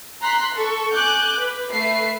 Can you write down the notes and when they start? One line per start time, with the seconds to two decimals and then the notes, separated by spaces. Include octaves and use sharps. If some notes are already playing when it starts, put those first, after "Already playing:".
0.21 A#5 C6 F#6 B6
0.54 A4 C#6
0.92 G#5 D6 F#6 G6
1.37 B4
1.72 A3 B4 E5 C7